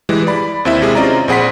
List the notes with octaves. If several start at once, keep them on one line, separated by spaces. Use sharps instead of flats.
E3 G3 G#3
D5 B5
D#2 C4 E4 E5
C3 G#3 G#4
C4 C#4 F4 D5 D#5 A#5
A#1 C4 G#4 F#5 B5 B6